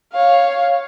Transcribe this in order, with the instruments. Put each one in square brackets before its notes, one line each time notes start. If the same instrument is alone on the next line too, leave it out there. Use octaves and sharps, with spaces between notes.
[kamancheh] C#5 F5